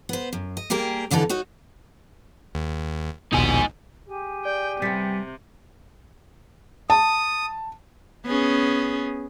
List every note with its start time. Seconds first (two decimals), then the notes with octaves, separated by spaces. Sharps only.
0.09 B3 C5
0.33 F#2
0.57 D#5
0.70 G3 A#3 G4 G#4 A#4
1.11 F2 D3 E3 D#4 A4
1.29 D#4 F#4 C#5
2.55 D#2
3.33 A#1 D#2 B2 D#4 G#5
4.06 G4 G#4 G#5
4.45 D5 G5
4.82 C3 G3 B3 A6 B6 C#7
6.90 A5 D#6
8.25 B3 C#4 G#4